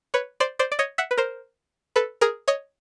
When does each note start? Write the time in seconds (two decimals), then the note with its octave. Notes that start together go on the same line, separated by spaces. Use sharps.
0.14 B4 C#5
0.40 C5 D5
0.59 C5 D5
0.72 D5
0.79 C#5 D#5
0.98 E5 F#5
1.11 B4
1.17 A#4 C5
1.96 A4 B4
2.21 G#4 A#4
2.48 C#5 D#5